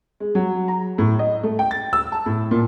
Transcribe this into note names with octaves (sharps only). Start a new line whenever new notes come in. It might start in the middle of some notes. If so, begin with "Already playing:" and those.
G#3
F#3
A#5
A2
D#5
A3
G5
A6
E6
A5
A2
A#2